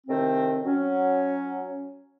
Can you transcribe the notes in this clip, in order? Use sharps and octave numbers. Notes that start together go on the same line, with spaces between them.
A2 C3 D#3 C4
F#3 C#4